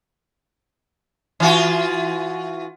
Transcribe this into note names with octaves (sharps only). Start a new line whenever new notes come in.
E3 F4 F#4